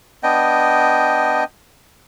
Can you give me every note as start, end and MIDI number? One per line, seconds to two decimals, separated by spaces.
0.23 1.44 59
0.23 1.44 62
0.23 1.44 75
0.23 1.44 79